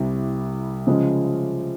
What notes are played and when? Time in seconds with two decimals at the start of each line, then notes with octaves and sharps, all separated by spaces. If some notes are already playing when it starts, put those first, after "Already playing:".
Already playing: C2 C3 G3 E4
0.87 C#3 F3 G#3